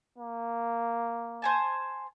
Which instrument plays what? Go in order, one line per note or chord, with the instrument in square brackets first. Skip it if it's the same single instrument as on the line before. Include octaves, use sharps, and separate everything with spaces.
[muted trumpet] A#3
[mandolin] C5 G#5 A5